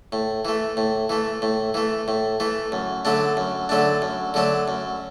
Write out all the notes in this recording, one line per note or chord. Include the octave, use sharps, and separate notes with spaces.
A2
E3 A3
A2
E3 A3
A2
E3 A3
A2
E3 A3
F#2
D3 F#3 A3 D4
F#2
D3 F#3 A3 D4
F#2
D3 F#3 A3 D4
F#2